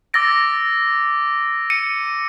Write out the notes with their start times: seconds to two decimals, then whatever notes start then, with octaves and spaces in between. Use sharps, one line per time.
0.14 D6 E6 A6 A#6 D7
1.70 C#7 D#7